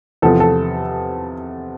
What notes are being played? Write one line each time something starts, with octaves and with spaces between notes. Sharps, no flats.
E2 C3 F3 A4
A4